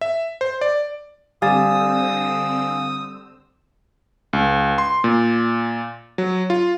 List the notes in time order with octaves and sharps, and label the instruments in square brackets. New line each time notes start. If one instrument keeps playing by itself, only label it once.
[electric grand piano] E5
C5
D5
[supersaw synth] D3 C4 E6 [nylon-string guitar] G3 [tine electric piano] F5 G#5 A6 [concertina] D#6
[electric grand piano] C#2
C6
A#2
F#3
F4